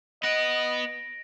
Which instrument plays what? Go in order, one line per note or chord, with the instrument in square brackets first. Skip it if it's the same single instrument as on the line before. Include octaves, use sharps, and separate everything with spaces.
[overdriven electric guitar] B3 F#5 [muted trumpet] D#5 [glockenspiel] A#6 D7